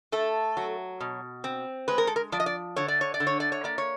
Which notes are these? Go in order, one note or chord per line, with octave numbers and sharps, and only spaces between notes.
A3 A4
F#3
B2
C4
G#3 B4
A#4
A4
A#4
F3 D5
D#5
D5
D3 C#5
D5
C#5
D5
D3
C#5
D5
C#5
A#3 D5
C#5